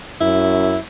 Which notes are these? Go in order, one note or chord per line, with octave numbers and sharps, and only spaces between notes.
F#2 E4